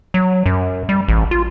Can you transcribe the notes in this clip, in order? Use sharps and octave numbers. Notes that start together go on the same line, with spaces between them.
F#3
F#2
G3
A1
F4